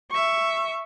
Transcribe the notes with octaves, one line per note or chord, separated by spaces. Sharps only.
E5 C#6